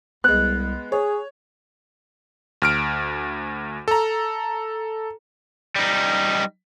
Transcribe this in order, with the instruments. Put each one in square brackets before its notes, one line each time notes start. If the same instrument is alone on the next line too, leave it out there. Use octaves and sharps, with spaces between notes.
[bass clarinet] C2 [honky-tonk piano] G#3 B3 [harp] F#6
[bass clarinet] G#4 [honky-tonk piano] C#5
[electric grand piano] D2 F6 D7
A4 A#5
[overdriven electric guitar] G3 D#4